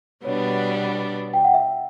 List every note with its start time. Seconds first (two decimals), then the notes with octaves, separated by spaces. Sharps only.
0.24 B2 G3 B3 D4 C#5
1.34 G5
1.44 F#5
1.54 E5